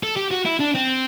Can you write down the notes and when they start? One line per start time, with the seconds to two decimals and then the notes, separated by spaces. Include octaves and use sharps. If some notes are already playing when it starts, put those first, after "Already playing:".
0.03 A4
0.17 G4
0.31 F#4
0.45 E4
0.60 D4
0.75 C4